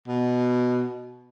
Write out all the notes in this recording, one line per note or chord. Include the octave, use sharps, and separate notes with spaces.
B2